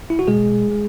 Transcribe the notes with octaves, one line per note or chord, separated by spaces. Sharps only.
E4
F#4
B2 G#3 G#4
G#3